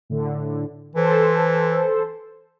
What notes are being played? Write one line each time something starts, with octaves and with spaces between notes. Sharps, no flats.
A2 D3
E3 A4 C5